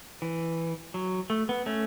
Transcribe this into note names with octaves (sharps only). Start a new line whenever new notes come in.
E3
F#3
A3
B3
A3 C#4